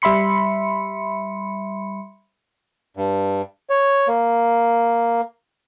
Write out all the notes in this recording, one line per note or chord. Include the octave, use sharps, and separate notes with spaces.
G3 E5 B5 C6 C#7
G2
C#5
A#3